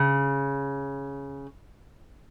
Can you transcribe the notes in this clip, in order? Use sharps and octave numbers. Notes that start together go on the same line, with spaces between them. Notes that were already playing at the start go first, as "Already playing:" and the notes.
Already playing: C#3